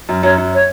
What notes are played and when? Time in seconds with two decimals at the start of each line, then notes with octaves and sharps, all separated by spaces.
0.09 F#2
0.23 F#2 C#5
0.38 F#2
0.54 C#5